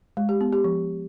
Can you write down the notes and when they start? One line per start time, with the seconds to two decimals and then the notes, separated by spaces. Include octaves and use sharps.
0.17 G#3
0.29 G4
0.41 B3
0.53 G4
0.64 F3